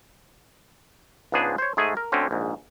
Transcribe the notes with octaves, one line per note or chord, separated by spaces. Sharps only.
C#2 G#2 B3 D4 G#4 C5
C5 C#5
G#2 G#3 A3 G#4 G#5
A#4
D2 D3 C4 C#4
A#1 G#2